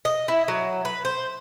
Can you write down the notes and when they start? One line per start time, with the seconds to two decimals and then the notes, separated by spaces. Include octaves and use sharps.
0.05 D#5
0.28 E4
0.48 F#3
0.85 B4
1.05 C5